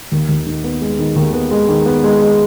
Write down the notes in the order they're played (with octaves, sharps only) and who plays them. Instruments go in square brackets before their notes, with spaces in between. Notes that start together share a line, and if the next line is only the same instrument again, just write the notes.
[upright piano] D#2
D#2
D#3
B3
G#3
D#3
D#2
B3
G#3
D#3
B3
G#3
G#3